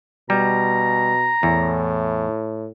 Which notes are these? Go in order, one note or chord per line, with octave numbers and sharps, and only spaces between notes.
B2 G3 A#5
E2 A2